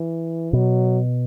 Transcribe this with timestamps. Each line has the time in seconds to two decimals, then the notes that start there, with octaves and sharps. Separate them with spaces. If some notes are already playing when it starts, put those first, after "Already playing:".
Already playing: E3
0.53 B2 F#3